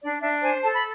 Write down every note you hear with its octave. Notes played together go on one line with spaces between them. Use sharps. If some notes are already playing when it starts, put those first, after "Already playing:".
D4 D5
D4 E5
C5 G#5
A4 A5
B5